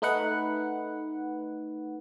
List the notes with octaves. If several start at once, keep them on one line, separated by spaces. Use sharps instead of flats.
A3 D#4 B4 F#5